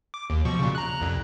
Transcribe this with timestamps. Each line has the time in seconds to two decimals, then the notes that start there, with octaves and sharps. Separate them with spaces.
0.14 D6
0.30 D#2
0.45 B2 F3 C#6
0.59 A#2 C#3
0.75 A#5 F#6
1.01 C2 F2